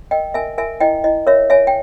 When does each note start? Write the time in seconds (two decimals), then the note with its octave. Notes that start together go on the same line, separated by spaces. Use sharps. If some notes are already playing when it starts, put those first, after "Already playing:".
0.11 A#4 D#5 G5
0.34 A#4 E5 G#5
0.58 A#4 E5 G#5
0.80 E4 D#5 G5
1.04 E4 D#5
1.27 A#4 C#5 E5
1.50 C#5 E5 G#5
1.67 G5